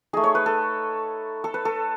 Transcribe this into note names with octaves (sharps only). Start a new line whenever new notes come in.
A3 D#4 G#4
C#5
B4
A4
A4
B4
A4